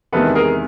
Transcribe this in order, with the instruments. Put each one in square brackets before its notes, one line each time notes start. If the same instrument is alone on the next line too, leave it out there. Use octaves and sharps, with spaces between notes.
[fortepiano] E2 C3 D#3 G#3 B3 [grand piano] A4 B4
[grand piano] G#4 A#4